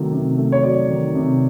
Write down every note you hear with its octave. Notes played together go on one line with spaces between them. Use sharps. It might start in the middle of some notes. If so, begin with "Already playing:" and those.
Already playing: C3 D#3 F#3 A3
C3
A3
C#5
F#3 D5
D#3
C3